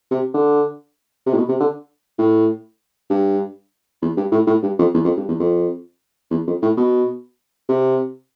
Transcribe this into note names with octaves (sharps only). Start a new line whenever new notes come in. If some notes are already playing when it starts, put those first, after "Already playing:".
C3
D3
C3
A2
B2
C3
D3
A2
G2
E2
G2
A2
A2
G2
F2
E2
F2
G2
E2
F2
E2
F2
A2
B2
C3